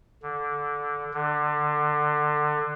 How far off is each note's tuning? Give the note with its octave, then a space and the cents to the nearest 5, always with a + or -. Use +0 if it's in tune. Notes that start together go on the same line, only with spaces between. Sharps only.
D3 -10
D3 +25